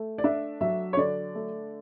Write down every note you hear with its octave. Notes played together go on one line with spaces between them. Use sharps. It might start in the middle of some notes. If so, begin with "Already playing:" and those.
Already playing: A3
D5
D4 E5
F#3 E5
C#5
D3 D5
A3